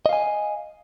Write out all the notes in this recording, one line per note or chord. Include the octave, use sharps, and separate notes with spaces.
D#5 F5 G#5